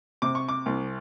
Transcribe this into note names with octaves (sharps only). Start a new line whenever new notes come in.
C3 D6
C#6
D6
C2